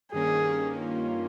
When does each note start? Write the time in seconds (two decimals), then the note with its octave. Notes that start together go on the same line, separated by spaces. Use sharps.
0.13 G2 D#3 A#3 C#4 G#4
0.79 F4